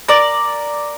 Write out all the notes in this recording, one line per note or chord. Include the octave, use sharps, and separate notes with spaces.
A#4 D5